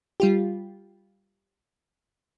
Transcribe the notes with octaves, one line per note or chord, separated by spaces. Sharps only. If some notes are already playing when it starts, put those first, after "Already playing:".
G3 F4 G4